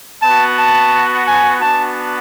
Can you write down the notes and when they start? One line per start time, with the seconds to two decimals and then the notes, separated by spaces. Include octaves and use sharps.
0.22 B3 F#4 A5
0.57 A5
1.27 G#5
1.61 B3 D4 F#4 A5